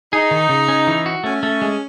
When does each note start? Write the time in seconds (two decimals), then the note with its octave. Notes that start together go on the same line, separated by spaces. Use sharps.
0.13 D#4 G#4
0.31 D#3
0.49 C#3
0.68 C#4
0.87 E3
1.06 F#4
1.24 A3 C#4
1.43 A3
1.62 G#3